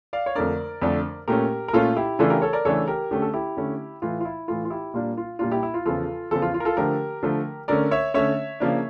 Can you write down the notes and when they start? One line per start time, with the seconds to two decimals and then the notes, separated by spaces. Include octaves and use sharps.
0.13 D5 F5
0.26 C#5
0.35 F2 D3 A3 D4 A#4 D5
0.82 F2 D3 A3 D4
1.28 A#2 A3 C#4 G4 A#4
1.68 A#4
1.73 A#2 A3 C#4 F4 A4
1.97 E4 G4
2.19 C#3 E3 A3 D4 F4 A4
2.30 G4 A#4
2.42 A4 C#5
2.53 A#4 D5
2.65 C#3 E3 A3 D4 A4 C#5
2.88 G4 A#4
3.11 D3 A3 C#4 G4
3.22 A4
3.33 E4 G4
3.57 D3 A3 C#4
4.02 A2 E3 A3 F4
4.21 F4
4.25 E4
4.48 A2 E3 A3 F4
4.65 F4
4.70 E4 G4
4.94 A#2 G3 A#3 D4 F4
5.17 F4
5.39 A#2 G3 A#3 D4 F4
5.51 E4 G4
5.63 E4
5.74 F4
5.86 E2 C#3 F3 F4 A4
6.31 E2 C#3 F3 F4 A4
6.42 F4
6.54 F4
6.60 A#4
6.65 F4 A4
6.77 D3 F3 A3 G4 A#4
7.23 D3 F3 A3
7.68 D3 A3 C#4 A#4 D5
7.91 C#5 E5
8.14 D3 A3 C#4 C#5 E5
8.60 C#3 F3 A#3 D4